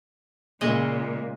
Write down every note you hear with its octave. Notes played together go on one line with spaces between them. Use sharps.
A#2 C#3 G#3 D#5 E5